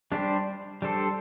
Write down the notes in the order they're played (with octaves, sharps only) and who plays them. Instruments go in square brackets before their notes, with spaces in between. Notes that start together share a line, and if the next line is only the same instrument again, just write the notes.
[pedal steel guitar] G3 D4 G4 C5
G3 D4 A4 C5